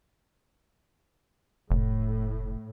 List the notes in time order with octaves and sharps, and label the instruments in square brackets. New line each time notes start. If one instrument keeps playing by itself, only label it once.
[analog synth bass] F1 [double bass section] A2